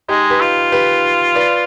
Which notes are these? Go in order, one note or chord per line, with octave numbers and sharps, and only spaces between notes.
G#3 D#4 G4
G4 B4
F4
G4 B4
B4 D5